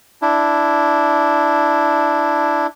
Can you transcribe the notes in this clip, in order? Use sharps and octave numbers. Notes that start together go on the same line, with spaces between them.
D4 E4